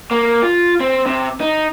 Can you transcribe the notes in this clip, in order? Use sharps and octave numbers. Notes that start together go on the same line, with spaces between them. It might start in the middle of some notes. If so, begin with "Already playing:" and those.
A#3
F4
C4
C3
D#4